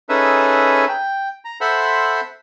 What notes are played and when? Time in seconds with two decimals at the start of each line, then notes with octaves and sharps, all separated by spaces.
0.09 C#4 D#4 G#4 A4 B4 E5
0.89 G5
1.45 A#5
1.61 A4 C5 E5 F#5 B5 C6